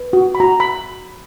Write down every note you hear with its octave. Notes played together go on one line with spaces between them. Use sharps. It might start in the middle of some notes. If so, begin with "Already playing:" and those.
Already playing: B4
F#4
B5
F#4 A#5
B5